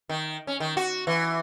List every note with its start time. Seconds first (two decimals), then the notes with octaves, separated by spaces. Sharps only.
0.09 D#3
0.47 C#4
0.60 D#3
0.77 F#4
1.07 E3